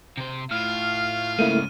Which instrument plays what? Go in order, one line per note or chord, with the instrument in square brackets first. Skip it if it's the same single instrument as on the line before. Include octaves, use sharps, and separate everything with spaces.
[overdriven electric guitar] C3 C5
[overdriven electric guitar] A2 [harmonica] F4 F5 [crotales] F6
[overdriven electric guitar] G#2 C#3 [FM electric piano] A3 A#3 E4 [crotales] D#7